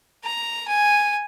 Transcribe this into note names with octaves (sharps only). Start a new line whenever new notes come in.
A#5
G#5